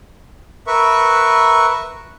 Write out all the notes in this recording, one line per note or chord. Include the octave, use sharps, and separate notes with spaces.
A#4 B4 E5 C#6